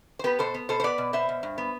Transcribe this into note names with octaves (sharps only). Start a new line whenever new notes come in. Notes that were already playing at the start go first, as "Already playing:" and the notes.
C5
B3 G4 B4
B2 A4 C5
B3
B2 A4 C5
C5
B3 B4 D5
B2
B3 C5 E5
B2
G2
B3